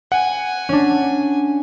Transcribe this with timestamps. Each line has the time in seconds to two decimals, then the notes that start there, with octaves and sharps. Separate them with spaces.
0.12 F#5 G#5
0.69 C#4 D4